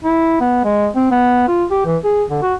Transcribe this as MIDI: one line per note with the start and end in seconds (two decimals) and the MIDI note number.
0.04 0.41 64
0.41 0.60 59
0.65 0.88 56
0.96 1.10 60
1.11 1.48 59
1.48 1.65 65
1.71 1.85 67
1.86 1.97 52
2.04 2.24 68
2.30 2.42 50
2.42 2.55 66